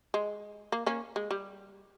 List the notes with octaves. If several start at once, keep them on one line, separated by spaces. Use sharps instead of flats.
G#3
A#3
A#3 C#4
G#3
G3